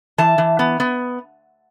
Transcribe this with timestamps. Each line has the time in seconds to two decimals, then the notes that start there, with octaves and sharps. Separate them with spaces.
0.18 E3 A5
0.38 E3
0.59 B3
0.80 B3